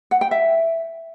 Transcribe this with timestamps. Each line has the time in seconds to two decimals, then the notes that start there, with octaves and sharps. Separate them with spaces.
0.11 F#5
0.21 G5
0.31 E5